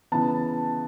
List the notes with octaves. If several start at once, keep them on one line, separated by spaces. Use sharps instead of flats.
C#3 E3 B3 A5